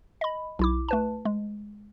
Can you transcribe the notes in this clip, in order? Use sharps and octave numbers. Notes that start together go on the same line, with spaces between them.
D#5 B5
B1 E4 D6
A3 B4 A5
G#3